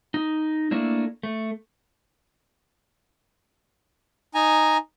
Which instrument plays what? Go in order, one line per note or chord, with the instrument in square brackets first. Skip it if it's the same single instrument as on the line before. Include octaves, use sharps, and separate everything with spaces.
[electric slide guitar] D#4
A3 A#3 D4 E4
A3
[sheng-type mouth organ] D#4 G#5 A#5